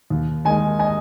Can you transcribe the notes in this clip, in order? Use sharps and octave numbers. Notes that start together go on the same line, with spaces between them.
D#2
D#3 G#3 D#5 G#5
D#5 G#5